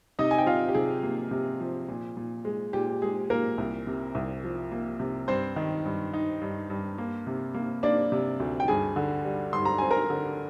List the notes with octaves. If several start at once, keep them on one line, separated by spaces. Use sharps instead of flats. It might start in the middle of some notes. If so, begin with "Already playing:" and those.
C3 D#4 D#5
G#5
G5
C3 F4 F5
G4
C3 G#4
A#3
C3
F3
A#2
A#2
G#3
A#2 G4
G#3 G#4
A#2 A#3 A#4
C2
C3
C2
F3
A#3
C3
G2 C4 C5
D#3
G2
D#4
G2
G2
A#3
C3
A#3
A#3 D4 D5
C3
D2
G5
G2 G#4 G#5
D3
G3
G2 C6
A#5
C4 G#5
A#4 A#5
D3